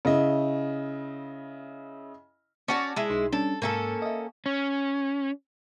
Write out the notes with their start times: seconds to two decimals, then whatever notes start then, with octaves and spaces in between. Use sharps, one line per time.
0.05 C#3 E4 D#5
2.68 C#4 F#4 D5 A5 D6
2.96 G#3 E4
3.10 B1 D#4 C6
3.32 G3 C#4 D4 A4
3.62 G#2 A#3 C#4 A4
4.02 D#5 E5
4.46 C#4